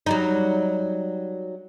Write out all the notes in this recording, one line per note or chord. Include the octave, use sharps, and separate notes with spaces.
F#3 G3 D#4